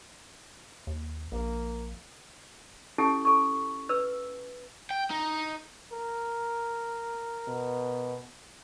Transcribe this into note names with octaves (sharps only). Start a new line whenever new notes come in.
D#2
A#1 A#3
C#4 E4 G4 A4 A5
A4 C#6
B4 E6
G5
D#4
A#4
B2